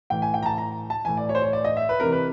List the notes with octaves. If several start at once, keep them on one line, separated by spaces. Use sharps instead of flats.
A2 E3 G5
G#5
G5
A#5
A5
A#5
A5
A2 E3 G#5
D5
C#5
C5
C#5
D5
D#5
E5
B4
C3 E3 A#4
B4